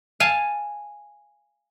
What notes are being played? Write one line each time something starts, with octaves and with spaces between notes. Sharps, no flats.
F5 G#5 A5